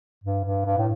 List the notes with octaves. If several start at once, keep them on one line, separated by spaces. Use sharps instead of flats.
G2
G2
G2
A2